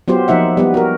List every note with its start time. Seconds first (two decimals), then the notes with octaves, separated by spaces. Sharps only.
0.08 F#3 B3 F4 G4 C5
0.28 F3 A#3 D#4 E5 F#5
0.57 G3 B3 B4
0.74 F#4 A#4